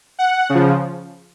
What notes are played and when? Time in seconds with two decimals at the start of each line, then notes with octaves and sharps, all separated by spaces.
0.19 F#5
0.50 C#3
0.55 F3